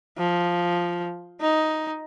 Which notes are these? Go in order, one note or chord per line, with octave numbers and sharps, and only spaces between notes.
F3
D#4